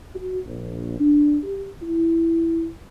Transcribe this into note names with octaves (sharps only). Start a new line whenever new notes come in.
F#4
A#1
D4
G4
E4